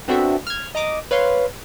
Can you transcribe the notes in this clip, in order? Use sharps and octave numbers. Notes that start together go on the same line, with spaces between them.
B3 C4 D4 F#4 A4 E5
F6 G#6
D#5 A#5 D6 D#6
B4 C#5 F5 C6